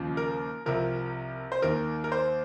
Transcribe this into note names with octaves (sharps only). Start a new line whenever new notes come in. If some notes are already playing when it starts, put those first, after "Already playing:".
Already playing: D#2 C#3 F3
A#4
C2 C3 F3 A#4
C5
D#2 D#3 A#4
A#4
C5